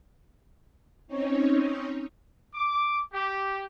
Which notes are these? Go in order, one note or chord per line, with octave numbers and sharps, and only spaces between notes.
C4 C#4 D#4 C#5
D6
G4